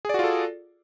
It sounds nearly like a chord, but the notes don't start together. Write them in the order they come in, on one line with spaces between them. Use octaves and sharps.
G#4 D5 F#4 F4 A4